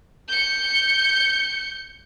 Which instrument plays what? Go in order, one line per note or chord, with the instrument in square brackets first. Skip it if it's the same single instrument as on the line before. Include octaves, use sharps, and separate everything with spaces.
[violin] G6 C#7